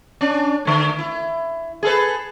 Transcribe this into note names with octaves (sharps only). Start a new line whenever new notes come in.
C#4 D4
D3 A3
E4
G#4 A4 B4